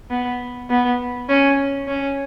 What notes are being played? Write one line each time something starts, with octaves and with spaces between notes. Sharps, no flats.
B3
B3
C#4
C#4